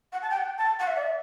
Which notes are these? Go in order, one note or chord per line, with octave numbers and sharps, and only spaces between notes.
F#5
A5
G5
F#5
G5
A5
F#5
E5
D5
E5